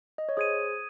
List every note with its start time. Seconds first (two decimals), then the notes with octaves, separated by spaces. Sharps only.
0.18 D#5
0.29 C#5
0.37 G#4 C5 D#6 G#6 D#7